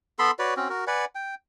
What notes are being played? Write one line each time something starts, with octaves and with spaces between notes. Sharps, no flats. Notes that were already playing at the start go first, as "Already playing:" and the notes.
B3 A4 B5 C6
F#4 B4 C#5 D5
C4 C#4 F#4
F#4 A#4
B4 D5 F#5 G#5
G5